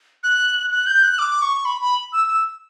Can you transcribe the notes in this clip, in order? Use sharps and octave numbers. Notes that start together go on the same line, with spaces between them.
F#6
F#6
G6
F#6
D6
C#6
B5
B5
E6
E6